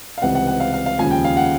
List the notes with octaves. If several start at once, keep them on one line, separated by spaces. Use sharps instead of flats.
F5
C#2 C3 E3 G3 C4 F#5
F#5
F#5
F5
F5
F5
D#2 C#3 F3 G#3 G#5
G5
F5
F#5